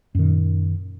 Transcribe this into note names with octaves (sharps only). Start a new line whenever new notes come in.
F#2 A#2 D#3